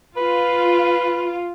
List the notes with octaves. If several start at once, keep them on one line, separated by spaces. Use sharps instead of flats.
F4 B4